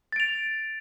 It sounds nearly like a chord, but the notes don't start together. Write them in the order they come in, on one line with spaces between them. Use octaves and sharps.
A6 D7 F7